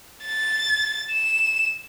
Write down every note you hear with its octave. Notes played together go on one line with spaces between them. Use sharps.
A6
E7